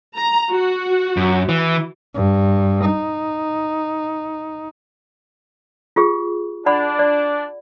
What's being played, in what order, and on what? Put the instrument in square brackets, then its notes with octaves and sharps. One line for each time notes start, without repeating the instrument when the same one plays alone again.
[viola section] A#5
F#4
[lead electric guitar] F#2
E3
[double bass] G2
D#4
[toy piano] F4 G4 G#4
[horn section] D4 [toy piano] D5 F#5 B5
[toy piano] D5